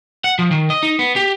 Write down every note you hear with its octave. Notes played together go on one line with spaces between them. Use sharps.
F#5
F3
D#3
D#5
D#4
B3
G4